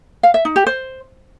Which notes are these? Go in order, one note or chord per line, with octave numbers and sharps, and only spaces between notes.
F5
E5
D#4
G4
C5